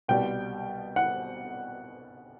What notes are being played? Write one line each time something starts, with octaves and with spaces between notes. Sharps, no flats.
C2 B2 G3 G5
F#5